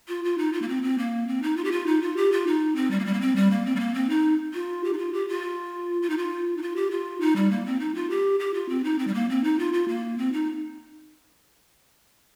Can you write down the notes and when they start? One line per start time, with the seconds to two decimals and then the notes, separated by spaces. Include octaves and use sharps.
0.08 F4
0.24 F4
0.38 D#4
0.53 F4
0.62 A#3
0.69 C4
0.83 C4
0.98 A#3
1.28 C4
1.43 D#4
1.57 F4
1.64 G4
1.72 F4
1.87 D#4
2.02 F4
2.17 G4
2.32 F4
2.47 D#4
2.76 C4
2.91 G3
3.00 A#3
3.05 G3
3.14 A#3
3.21 C4
3.36 G3
3.51 A#3
3.66 C4
3.76 G3
3.80 A#3
3.94 C4
4.10 D#4
4.54 F4
4.84 G4
4.93 D#4
4.98 F4
5.13 G4
5.29 F4
6.02 F4
6.10 D#4
6.18 F4
6.57 D#4
6.62 F4
6.76 G4
6.91 F4
7.20 D#4
7.36 G3
7.51 A#3
7.66 C4
7.80 D#4
7.95 F4
8.10 G4
8.40 G4
8.54 F4
8.69 C4
8.84 D#4
8.99 C4
9.07 G3
9.14 A#3
9.29 C4
9.44 D#4
9.59 F4
9.73 F4
9.88 A#3
10.18 C4
10.33 D#4